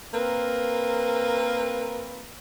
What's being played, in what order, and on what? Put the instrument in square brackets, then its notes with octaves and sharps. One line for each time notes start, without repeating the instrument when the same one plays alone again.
[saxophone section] A#3 C4 A#4 B4